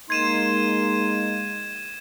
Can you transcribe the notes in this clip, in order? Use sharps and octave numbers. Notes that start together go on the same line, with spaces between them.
G#3 A#3 D#4 C6 G#6 D#7 E7